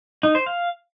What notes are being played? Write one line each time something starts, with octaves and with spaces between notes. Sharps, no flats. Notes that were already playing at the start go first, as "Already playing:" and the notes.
D#4
C5
F5